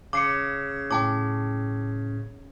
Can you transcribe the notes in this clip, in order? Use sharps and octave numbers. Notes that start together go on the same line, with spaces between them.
C#3 D6 C7 C#7
A2 C#4 G5 A5 D6